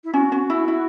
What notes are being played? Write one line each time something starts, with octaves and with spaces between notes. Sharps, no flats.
E4
C#4 F#4
C#4
E4
E4